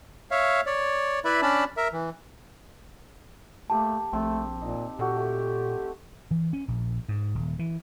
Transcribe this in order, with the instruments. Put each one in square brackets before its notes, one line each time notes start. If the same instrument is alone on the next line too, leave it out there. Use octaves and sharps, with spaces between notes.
[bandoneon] C#5 E5 F5
C#5 D5
E4 B4 D5 E5 B5
C#4 D4 D5 A5 B5
A#4 E5
E3
[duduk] A3 [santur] A#3 G4 D6 [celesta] A5
[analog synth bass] A#1 [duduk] A3 [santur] C4
[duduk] A#2 [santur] D#4
[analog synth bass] A#2 [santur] F#4 A4 A#4 [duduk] G4
[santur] A3 A4
[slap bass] E3
C#4
A#1
G#2
D#1
E3